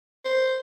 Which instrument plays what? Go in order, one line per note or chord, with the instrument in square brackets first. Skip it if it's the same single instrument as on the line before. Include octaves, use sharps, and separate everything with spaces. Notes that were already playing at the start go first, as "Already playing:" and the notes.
[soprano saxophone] C5